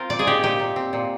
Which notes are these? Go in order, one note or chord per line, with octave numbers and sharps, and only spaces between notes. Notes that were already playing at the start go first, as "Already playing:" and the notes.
Already playing: C4 F4 A#4 C5
A#2 D5
G#4
D#4 G4
A#2 G4
A#2
C4
A#2